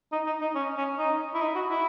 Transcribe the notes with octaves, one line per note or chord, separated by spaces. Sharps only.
D#4
D#4
D#4
C#4
C#4
D#4
E4
D#4
F#4
E4